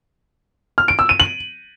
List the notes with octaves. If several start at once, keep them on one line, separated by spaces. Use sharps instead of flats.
F6
D7
E6
D#7
F#7